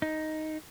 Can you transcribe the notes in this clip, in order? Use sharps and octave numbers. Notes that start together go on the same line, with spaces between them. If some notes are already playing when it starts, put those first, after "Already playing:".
D#4